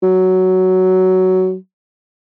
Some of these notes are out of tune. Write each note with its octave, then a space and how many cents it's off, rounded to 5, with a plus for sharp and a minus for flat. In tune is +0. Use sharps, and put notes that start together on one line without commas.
F#3 +10